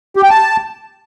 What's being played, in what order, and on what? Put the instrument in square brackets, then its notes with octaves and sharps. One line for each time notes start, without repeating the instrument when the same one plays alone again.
[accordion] G4
G5
A5